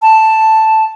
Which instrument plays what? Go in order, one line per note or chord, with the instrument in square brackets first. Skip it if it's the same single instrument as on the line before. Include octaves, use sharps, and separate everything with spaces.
[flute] A5